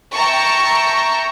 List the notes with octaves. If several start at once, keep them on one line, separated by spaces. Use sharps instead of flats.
E5 G5 A5 A#5 C#6